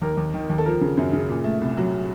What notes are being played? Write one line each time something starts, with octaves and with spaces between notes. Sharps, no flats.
D#2 A#4
D#2
D#3
D#2
A4
F3 A#4
C#3
F#2
C#3
A#2
A3
C2
F#3